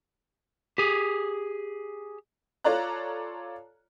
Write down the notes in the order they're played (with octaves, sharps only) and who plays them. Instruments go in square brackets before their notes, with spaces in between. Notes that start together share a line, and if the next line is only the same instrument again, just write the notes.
[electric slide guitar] G4 G#4
[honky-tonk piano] F4 A4 C#5 D5 A#5 F#6